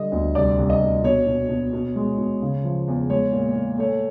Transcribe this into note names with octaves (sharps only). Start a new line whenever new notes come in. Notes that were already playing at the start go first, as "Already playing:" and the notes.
Already playing: D3 G3 D#5
D2
C2 D5
C2
D#5
C2
B2 C#5
B2
B2
B2
G#3
B2
C#3
F3
E2
G#3 C#5
A#2
A#2
A3 C#5